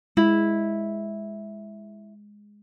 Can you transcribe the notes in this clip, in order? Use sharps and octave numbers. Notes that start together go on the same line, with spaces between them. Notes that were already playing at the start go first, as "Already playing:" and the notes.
G#3 E4